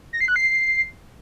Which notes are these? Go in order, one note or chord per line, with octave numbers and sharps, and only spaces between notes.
A#6
C7
F#6
C7